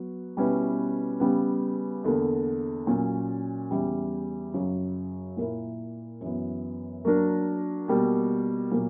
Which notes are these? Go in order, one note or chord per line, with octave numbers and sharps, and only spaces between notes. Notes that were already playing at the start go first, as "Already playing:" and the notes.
Already playing: F#3 B3 F#4
B2 G3 C#4 E4 B4
C#3 G3 B3
E2 D3 A#3
A#2 F#3 C#4
E2 C#3 E3 G3
F#2 C#3 F#3
A#2 A#3 E4 A#4
F#2 E3 B3
F#3 A#3 D4 A#4
B2 G3 A#3
A#2 F#3 A#3